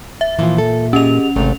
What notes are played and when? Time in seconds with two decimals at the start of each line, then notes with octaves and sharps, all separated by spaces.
0.21 E5
0.39 A#2 E3 F3 F4
0.58 A4
0.93 C#4 G4 G#4 D#5 F7
1.36 G#1 C3 A3